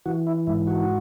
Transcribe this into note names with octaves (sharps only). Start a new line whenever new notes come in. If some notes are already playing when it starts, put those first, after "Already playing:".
E3 F#4
E4
G#2 E4
F#4